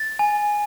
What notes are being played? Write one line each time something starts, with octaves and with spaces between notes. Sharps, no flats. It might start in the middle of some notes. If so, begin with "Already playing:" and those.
Already playing: A6
G#5